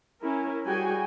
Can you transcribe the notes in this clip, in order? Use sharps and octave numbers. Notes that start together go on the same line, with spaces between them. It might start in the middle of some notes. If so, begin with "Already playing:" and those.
C#4 E4 A#4
G3 F#4 G#4 G5 G#5